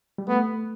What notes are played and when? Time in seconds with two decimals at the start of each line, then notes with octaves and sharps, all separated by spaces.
0.18 G3
0.28 A3 B3